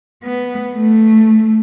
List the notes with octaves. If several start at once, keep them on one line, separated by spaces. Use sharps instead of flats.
B3
A3